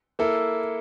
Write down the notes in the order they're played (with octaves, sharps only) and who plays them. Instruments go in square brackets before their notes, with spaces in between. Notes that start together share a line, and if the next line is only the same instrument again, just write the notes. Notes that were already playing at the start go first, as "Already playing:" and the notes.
[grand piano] A#3 E4 A4